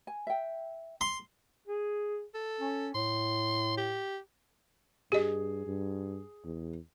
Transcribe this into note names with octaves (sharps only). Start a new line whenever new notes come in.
G#5
E5 G5
C6
G#4
A4
C#4
A2 C6
G4
G2 G4 G#4 D#5
G2
E2